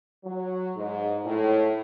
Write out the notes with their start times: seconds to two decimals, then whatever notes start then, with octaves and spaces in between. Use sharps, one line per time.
0.24 F#3
0.77 G#2
1.25 A2